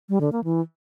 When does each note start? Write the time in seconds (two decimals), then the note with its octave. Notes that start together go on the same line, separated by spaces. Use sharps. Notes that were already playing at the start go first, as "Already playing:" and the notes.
0.09 G3
0.21 D3
0.32 A#3
0.44 E3